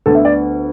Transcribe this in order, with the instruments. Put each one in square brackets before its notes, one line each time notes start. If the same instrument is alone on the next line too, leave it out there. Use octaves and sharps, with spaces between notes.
[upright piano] D2 D3 B3 A4
E5
D5